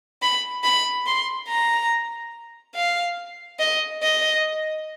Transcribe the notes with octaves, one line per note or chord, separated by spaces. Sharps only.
B5
B5
C6
A#5
F5
D#5
D#5